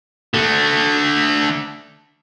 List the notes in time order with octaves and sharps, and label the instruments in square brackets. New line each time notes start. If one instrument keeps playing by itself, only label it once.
[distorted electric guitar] D3 A3